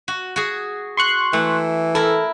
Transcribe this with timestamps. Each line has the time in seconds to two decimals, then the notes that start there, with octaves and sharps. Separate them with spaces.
0.08 F#4
0.36 F#4 G#4
0.97 C6 C#6 F#6
1.33 E3 A3
1.95 E4 A4 A#4